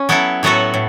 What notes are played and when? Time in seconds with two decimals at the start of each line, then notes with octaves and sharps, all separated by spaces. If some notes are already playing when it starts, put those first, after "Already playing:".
Already playing: C#4
0.09 F#3 B3 E4 A4
0.43 A2 F#3 B3 F#4 A4
0.74 A2